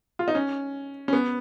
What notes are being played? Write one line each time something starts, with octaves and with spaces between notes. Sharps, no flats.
F4
D#4
C#4
C#4
B3